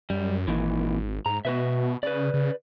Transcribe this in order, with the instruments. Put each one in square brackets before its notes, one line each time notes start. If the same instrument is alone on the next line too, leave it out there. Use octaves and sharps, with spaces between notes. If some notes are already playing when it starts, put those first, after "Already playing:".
[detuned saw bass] F#2 [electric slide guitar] G3
[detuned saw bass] G#1 [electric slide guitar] A#2 D#3 E3
[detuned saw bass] G#2 [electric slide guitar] A#5
[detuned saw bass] B2 [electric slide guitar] F#4 B4 E5
[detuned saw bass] C#3 [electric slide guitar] B4 D5
[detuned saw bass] C#3